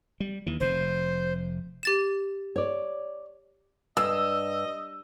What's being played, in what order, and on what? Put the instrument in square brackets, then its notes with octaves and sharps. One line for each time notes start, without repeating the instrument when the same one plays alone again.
[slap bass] G3
D#2 E3
[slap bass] F1 C3 [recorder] C5
[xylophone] G4 A6 E7
[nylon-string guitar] C#5 D5
[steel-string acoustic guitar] G2 [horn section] D#5 [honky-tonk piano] E6